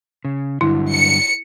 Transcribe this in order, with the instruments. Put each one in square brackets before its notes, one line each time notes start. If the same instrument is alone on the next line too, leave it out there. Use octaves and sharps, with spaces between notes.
[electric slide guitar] C#3
[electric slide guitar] G2 D3 F#3 [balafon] E4
[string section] C#7